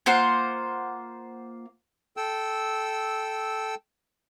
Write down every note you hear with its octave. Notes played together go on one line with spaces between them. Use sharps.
A#3 F4 C5 F#5
A4 G5 E6